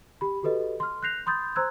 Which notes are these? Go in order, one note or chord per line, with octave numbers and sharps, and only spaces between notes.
G4 B5
F#4 G4 A4 B4 D#5
C6 F6
F#6 G6 A#6 C7 F7
B5 C6 D#6 G6 A6
C5 A#5 C6 E6 F#6 G#6